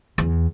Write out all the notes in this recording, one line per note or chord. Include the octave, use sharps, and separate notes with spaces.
E2